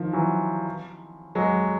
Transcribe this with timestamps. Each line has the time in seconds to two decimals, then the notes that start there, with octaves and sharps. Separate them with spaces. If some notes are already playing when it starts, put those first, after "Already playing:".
Already playing: D#3 F3
0.13 E3 F#3
1.35 F#3 G#3